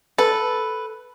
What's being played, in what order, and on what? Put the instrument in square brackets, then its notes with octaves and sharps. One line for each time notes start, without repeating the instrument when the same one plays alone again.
[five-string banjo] A4 [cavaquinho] B4